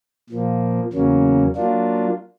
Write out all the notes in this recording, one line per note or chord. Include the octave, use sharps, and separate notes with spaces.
A#2 F3 A#3
E2 C#3 F#3 A#3 C#4
F#3 A#3 D4 F4